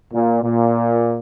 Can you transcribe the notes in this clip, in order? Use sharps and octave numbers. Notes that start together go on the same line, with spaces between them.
A#2
A#2